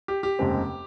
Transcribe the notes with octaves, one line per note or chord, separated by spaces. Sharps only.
G4
G4
F1 D#2 C#3 G#3 C4